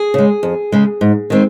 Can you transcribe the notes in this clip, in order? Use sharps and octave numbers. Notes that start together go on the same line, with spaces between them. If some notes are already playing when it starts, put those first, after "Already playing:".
Already playing: G#4
C#3 G#3
F2
C#3 G#3
G#2
D#3 G#3 C4